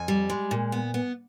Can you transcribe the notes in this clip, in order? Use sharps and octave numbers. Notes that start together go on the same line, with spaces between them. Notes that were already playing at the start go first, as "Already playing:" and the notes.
Already playing: F2 G#5
G3
G#3
A#2
B3
B3